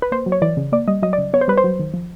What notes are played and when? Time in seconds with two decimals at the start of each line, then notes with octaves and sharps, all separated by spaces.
0.02 B4
0.12 A#3 C5
0.26 F#3
0.32 C#5
0.42 E3 D5
0.57 C#3
0.72 A#3 D5
0.88 G3 D#5
1.02 F#3 D#5
1.13 D5
1.18 C#3
1.33 B3 C#5
1.41 C5
1.48 G3 B4
1.57 C5
1.64 F#3
1.79 D#3
1.94 F3